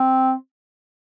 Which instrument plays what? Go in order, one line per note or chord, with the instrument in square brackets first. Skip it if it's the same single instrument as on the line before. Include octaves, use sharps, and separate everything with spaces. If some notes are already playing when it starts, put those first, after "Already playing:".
Already playing: [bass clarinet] C4